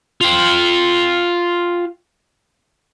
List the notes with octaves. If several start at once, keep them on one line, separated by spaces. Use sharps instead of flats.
F4 G5